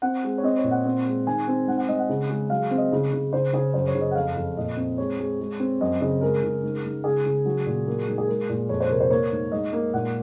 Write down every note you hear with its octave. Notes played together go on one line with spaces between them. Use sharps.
C4 F#5
G#3
C#5
C4 D#5
C#5
A#2
F#5
C4
G#3
D#3 G#5
C4
G#2 F#5
F#5
G#2 D#5
F#5
C#3
G#3
F#3 F5
C4
D#5
C#3
C#3
C#3 C5
C#3 G#4
F#2 C5
C#5
C#3
D#5
F#5
F2 F5
F2
A#2 D#5
C4
G#3 C#5
G#3
G#3
C4
F#2 D#5
C#3 D#5
G#3 A#4
C#3
G#2
G#2
C#3 G#4
C#3
F#3
A#2
A#3
G#2
G#4
G#3 A#4
A#2
F2 C#5
C5
C3 A#4
C5
A#3 C#5
G#2
G#2 D#5
A#3
A#2 F#5